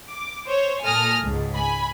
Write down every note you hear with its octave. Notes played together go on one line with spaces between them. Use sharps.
D6
C5 C#5
A#2 A4 G#5 D#6 F6 A#6
C#2 G#2
G#5 B5